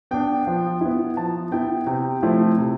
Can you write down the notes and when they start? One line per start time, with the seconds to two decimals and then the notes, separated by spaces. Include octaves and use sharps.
0.11 B3 D4 G5
0.47 F3
0.81 B3 E4
1.17 F3 A5
1.52 B3 E4 G5
1.87 C3 G5
2.22 F3 A3 C4 E4
2.58 C3